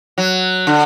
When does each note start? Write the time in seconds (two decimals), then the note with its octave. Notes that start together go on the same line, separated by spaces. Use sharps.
0.18 F#3
0.67 D3